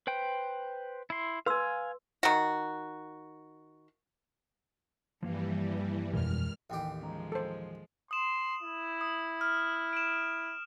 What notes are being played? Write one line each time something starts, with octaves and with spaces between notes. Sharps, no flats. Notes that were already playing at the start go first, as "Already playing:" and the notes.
B4 C5 G5
E4 C6
B4 F5 G#5 C6 E6
D#3 F#4
G2 E3 F3 G3 A#3 F5
F2 B2 E3 G#3 A#4 F6
A1 D#2 E4 G4 G5 G#5
F3 G#3 C#4 A#5
A4 C5
C6 D#6 E7
E4
D#6
F6
D7 E7